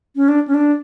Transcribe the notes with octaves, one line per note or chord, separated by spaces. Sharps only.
C#4
D4
C#4
D4